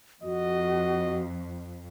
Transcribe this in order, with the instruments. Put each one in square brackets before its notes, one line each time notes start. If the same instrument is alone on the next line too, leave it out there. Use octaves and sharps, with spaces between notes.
[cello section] F2 [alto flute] F#4 [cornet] D#5